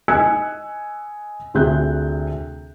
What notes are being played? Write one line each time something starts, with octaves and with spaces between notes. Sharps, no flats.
D#5 G#5 E6 F#6 G#6 C#7
D2 C3 F4 G#4 F#6 G6